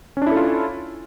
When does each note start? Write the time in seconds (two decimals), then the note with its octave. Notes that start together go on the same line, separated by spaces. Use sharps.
0.17 C#4
0.22 D4
0.27 E4
0.31 A4
0.36 F4